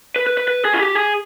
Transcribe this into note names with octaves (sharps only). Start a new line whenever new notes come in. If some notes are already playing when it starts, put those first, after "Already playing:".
B4
B4
B4
B4
G#4
F4
G4
G#4